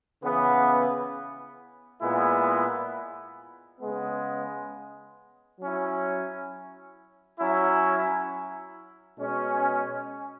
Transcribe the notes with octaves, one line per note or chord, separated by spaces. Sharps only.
C#3 E3 B3
A#2 G#3 B3 E4
C#3 G#3 B3
F#3 C#4 E4
F#3 C#4 E4
B2 G#3 C#4